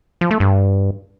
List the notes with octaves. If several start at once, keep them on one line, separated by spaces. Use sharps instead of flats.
F3
A3
G2